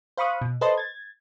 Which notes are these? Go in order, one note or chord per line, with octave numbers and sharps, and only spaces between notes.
C5 F5 B5 C#6 D#6 F#6
B2
A4 B4 C5 D#5 A5 C6
G#6 A6